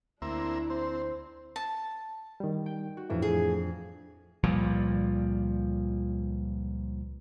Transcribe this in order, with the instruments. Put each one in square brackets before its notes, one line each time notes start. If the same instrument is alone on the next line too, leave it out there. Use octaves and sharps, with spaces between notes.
[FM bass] D2 [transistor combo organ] A#3 C4 E5 [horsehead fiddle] D4 E4
[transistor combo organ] C4 [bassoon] C5
[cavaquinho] A5
[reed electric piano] D#3 G3
[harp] G5
F#4
[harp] F2 D4 [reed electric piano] A2 E3 A3
[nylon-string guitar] G#4
[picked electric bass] C#2 A#2 F3 G3